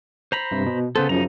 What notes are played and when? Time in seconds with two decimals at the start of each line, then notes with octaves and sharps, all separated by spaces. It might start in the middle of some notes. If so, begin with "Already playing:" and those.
0.32 C5 A#5 B5
0.51 G2 C3
0.66 B2
0.96 C#3 B3 A4 C5
1.09 F#2 C#3 F3 D#4 A#5